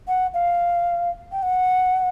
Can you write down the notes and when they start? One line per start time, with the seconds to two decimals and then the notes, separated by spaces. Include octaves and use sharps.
0.08 F#5
0.34 F5
1.32 G5
1.43 F#5